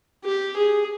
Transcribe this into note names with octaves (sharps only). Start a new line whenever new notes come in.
G4
G#4